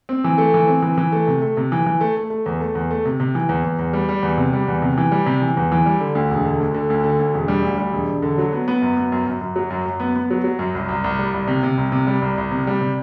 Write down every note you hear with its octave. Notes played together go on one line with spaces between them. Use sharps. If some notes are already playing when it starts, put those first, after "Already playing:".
C4
E3
A3
E3
C4
E3
E3
A3
C3
A3
C3
E3
E3
A3
A3
A3
E2
A3
E2
A3
C3
C3
E3
E2
E2
E2
G3
G3
E2
C3
G3
E2
C3
E3
G3
C3
E3
E2
E3
G3
D3
D2
E1
D3
D2
D3
D2
D3
D2
E1
G3
D2
G3
E1
E1
D3
F#3
B3
B3
F#2
B3
F#2
F#2
F#2
F#3
F#2
F#2
B3
B3
F#3
F#3
F#2
C2
C2
C2
G3
C2
C3
C3
C2
C3
G3
C2
C2
C3
G3
C3